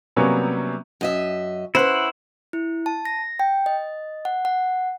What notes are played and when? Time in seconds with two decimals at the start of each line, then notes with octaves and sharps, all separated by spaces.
0.16 C3 F#3 G3 A#3 B3 C#4
1.01 F#2 D#5 E5
1.75 C#4 E4 B4 C5 F#5
2.53 E4
2.86 A5
3.05 A#6
3.39 G5
3.66 D#5
4.25 F#5
4.45 F#5